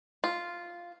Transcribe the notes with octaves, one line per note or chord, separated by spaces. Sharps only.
F4